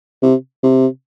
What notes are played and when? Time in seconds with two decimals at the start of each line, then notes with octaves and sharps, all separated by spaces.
0.23 C3
0.63 C3